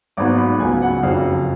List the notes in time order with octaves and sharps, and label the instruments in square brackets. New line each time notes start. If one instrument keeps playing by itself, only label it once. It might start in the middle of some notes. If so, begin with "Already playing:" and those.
[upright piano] G#1 G#2 F#3 B3 D6
B5
C#2 C#3 F#3 B3 G#5
F#5
F#1 F2 C#3 F#3 F5